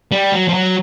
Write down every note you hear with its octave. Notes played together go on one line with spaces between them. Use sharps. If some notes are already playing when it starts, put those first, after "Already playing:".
G3
F#3
F3
F#3